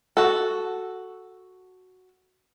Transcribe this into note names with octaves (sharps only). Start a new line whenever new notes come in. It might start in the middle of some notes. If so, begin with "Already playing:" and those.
F#4 A4